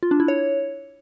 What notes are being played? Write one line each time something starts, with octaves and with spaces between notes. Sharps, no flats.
F4
D4
E4
C#5